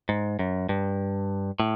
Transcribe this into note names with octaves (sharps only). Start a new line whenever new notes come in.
G#2
F#2
G2
A2